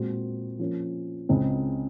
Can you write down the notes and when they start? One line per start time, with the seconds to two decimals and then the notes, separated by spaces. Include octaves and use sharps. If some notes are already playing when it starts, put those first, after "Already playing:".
Already playing: A#2 G#3 C4 F#4 C5
0.59 F3 A#3 C#4
1.29 C#2 C#3 G#3 C4